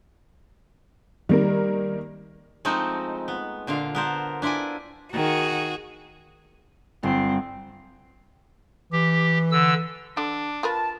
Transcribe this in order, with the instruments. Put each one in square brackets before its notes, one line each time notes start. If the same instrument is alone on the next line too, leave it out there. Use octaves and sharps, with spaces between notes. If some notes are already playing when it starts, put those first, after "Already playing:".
[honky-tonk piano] D#3 A#3 A#4 [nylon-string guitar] G3
[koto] F3 G#3 A3 C4 D#4
B3
A#2 D3 F4 F5
B3 A#4 C5 A5
D4 E4 F4 D5 G#5
[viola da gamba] D#3 [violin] F#4 G#4
[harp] G1 [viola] C4
[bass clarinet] E3 [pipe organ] G4
[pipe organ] D3 E6
[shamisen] D3 [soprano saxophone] D4
[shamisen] F4 A#4 B4 [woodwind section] A5